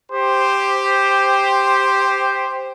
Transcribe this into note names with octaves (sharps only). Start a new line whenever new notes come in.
G4 C5